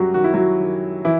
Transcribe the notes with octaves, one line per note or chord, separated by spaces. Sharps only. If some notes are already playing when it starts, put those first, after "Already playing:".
Already playing: F#2 F#3 G3 F#4 G4
D#3 F#4
E4
F#3 F#4
D#3
E3 E4